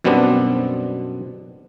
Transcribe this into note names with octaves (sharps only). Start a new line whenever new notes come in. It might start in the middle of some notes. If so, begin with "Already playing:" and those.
F#2 B2 G3 B3 C4 D4